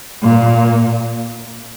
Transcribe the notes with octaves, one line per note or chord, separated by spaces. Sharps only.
A#2